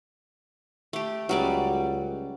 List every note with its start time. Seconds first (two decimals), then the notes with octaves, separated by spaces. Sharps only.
0.93 A3 G4
1.29 C#2 F#3 G3 D5